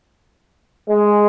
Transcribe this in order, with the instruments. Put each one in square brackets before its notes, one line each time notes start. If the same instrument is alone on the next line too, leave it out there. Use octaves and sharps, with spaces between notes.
[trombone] G#3